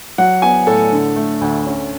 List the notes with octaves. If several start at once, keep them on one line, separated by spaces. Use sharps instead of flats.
F#3 F#5
B3 G#5
A2 A4
D3
A3
D2
C#4